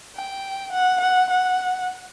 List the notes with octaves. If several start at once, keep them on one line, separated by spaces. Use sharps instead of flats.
G5
F#5
F#5
F#5